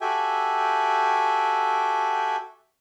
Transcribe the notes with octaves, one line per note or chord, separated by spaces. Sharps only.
F#4 G4 A4 E5 G5 G#5